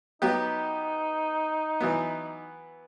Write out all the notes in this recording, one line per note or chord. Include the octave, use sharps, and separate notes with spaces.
F#3 B3 D#4 G4
E3 F#3 B3